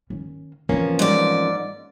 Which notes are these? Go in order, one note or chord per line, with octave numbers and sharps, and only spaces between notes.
D#3 C#4
E3 F3 A#3 C4 C#4
G#2 D5